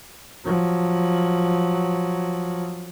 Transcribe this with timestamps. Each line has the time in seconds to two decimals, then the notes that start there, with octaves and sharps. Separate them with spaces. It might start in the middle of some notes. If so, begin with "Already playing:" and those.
0.45 F3 F#3